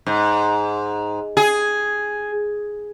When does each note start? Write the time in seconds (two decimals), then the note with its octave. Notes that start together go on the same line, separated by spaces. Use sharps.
0.06 G#2
1.37 G#4